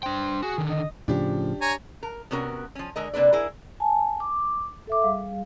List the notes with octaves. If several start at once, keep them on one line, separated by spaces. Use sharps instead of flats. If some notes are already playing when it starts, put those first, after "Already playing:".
D4 C5 G5
F#4 G#4
D3 D#3
D#5
A2 C#3 F3 D4 G4
C#5 G#5 A#5
A#4
C3 B3 C#4 F#4 A#4
F3 C#4
D3 G#3 A#4 D#5
C3 A#3 D4 B4 D5
E4 G#4 A#4
G#5 A5
D6
A4 E5 D6
G3 G#4 F5